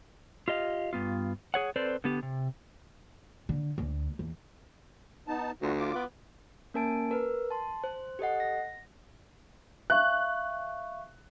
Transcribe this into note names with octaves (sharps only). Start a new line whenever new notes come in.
F4 G4 D#5 F5
G2 B3 F4
G#4 C#5 F#5
C4 A4 B4 C5 D5
D3 B3 G4
C3
D3
D2
E2
B3 D#4 A5
D2 G3 F4 F#4
F4 D6
B3
A#3 C#4 A#4 G#5 A5 D7
A#4 B4
A5 C6
C5
G4 A4 D#5 F#5
A#6
E5 F5 C#6 F#6